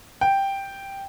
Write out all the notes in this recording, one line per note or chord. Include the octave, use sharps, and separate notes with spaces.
G5